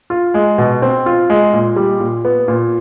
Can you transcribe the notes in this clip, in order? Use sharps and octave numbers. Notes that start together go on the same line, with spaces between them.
F4
G#3
B2
C4
F4
G#3
A#2
G3
A#2
B3
A#2